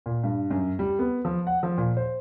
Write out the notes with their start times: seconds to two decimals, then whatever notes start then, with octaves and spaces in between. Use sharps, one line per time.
0.06 A#2
0.24 G2
0.51 F#2
0.79 G3
0.99 B3
1.25 F3
1.47 F#5
1.63 F3
1.78 A#2
1.97 C5